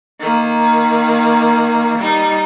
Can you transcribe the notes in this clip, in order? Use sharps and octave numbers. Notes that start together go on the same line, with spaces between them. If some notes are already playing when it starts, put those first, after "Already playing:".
D#3 A#3
G3 D#4